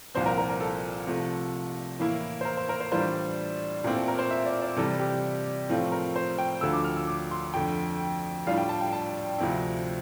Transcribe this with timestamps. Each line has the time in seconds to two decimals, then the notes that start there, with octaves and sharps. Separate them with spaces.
0.15 C2 A#2 F3 C4 C5
0.26 A#4
0.38 A#4
0.49 A#4
0.60 A4
1.07 C3 F3 A3
1.99 A2 E3 A#3 E4
2.41 C5
2.45 A#4
2.57 C5
2.69 A#4
2.80 C5
2.92 A2 E3 G3 D4 F4 C5
3.84 A#2 A3 C4 E4
3.95 A4
4.08 A#4
4.19 C5
4.31 E5
4.45 D5
4.62 D5
4.76 C3 E3 G3 A4
4.99 G4
5.69 A2 F3 A3 C4 F4
5.92 A#4
6.16 C5
6.38 G5
6.61 D2 D3 F3 E6
6.73 D6
6.84 F6
6.96 E6
7.07 D6
7.31 C6
7.54 F2 D3 A3 G5
8.47 A2 G3 D4 F4 F5
8.57 G5
8.69 A5
8.81 G5
8.92 A5
9.38 D2 C3 F3 C4 E4